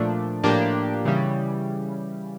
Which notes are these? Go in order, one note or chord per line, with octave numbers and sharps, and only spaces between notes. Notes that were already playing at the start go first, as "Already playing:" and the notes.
Already playing: A#2 F3 A3 D4
A2 F3 A#3 D4 G4
C#3 E3 G3